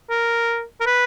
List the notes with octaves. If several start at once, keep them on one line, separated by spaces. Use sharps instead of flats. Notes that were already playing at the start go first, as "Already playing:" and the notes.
A#4
A#4
B4